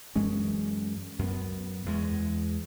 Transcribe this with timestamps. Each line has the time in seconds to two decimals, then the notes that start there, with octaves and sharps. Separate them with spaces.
0.15 F#2 E3 G#3 C#4
1.19 F#2 B3
1.86 E2 G#3